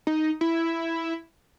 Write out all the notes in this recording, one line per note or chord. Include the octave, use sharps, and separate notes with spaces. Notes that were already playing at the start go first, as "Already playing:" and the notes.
D#4
E4